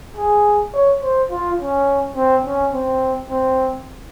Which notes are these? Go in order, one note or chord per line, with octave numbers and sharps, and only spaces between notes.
G#4
C#5
C5
F4
C#4
C4
C#4
C4
C4